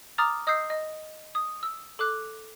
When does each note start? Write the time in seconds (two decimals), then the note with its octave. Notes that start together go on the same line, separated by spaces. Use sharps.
0.18 A#5 D6 D#6 F6 A6
0.47 D#5 D#6 E6 G6 C7
0.70 D#5
1.35 D#6
1.63 E6
1.99 A4 D6 F#6